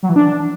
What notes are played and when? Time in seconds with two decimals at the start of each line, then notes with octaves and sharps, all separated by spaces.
0.03 F#3
0.09 E3
0.16 D4